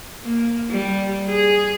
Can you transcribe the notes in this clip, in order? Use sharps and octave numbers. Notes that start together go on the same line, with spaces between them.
A#3
G3
G#4